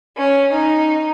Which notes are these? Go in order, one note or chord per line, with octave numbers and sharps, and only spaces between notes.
C#4
D#4